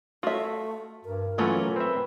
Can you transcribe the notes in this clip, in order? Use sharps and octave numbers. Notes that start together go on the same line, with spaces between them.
A3 F4 F#4 E5
G2 A#4
E3 F#3 A3 A#3 C#4 F4
C4 B4 E5